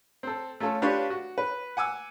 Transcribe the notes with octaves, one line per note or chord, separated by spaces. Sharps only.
C4 A4
A3 C#4 F4 A4
D4 F4 G4 B4 C#5
F#4
B4
F#5 G#5 D6 E6